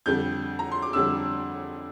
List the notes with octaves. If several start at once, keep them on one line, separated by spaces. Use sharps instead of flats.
F2 D3 G3 G6
A#5
C6
D6
F2 D3 G3 E6